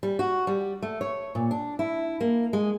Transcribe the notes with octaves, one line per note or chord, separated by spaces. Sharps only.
G3
F#4
G3
A3
C#5
A#2
D4
E4
A#3
G#3